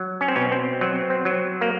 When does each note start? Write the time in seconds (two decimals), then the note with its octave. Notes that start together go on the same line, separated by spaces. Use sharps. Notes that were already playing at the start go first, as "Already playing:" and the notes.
Already playing: F#3
0.21 C#4
0.28 C4
0.36 B2 C#4
0.52 C4
0.81 F#3 C4
1.10 C4
1.25 F#3
1.61 A#3